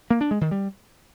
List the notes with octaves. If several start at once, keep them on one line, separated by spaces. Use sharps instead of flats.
A#3
D4
G#3
D#3
G3